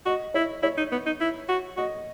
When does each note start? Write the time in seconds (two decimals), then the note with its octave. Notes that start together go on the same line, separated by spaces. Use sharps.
0.06 F#4 D#5
0.34 E4 C#5
0.63 E4 C#5
0.78 D#4
0.92 B3
1.06 D#4
1.21 E4
1.49 F#4
1.77 F#4 D#5